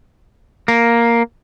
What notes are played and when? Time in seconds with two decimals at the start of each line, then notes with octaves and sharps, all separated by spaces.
0.68 A#3